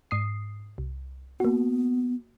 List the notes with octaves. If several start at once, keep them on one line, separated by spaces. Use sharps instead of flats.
G#2 D#6 C7
C2
A#3 B3 F#4